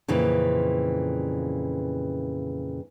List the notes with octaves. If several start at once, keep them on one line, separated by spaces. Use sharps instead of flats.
F2 A#2 C#3 E3